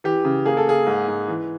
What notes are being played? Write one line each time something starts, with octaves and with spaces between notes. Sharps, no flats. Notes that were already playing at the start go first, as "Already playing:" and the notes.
E3 G4
C#3
A#3 G#4
A4
A#3 G#4
G#2
G#2
E3